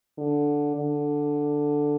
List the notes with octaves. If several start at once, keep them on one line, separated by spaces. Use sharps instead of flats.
D3
D3